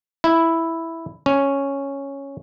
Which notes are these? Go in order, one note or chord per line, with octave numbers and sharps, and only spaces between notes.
E4
C#4